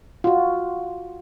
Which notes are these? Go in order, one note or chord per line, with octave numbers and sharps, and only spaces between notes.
F4 F#4